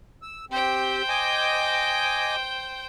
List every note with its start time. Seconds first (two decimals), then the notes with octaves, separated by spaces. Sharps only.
0.22 E6
0.51 C4 G4 C5 G5
1.09 D#5 G#5 D6